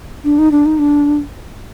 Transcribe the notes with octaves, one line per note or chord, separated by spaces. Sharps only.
D4
D#4
D4
D#4
D4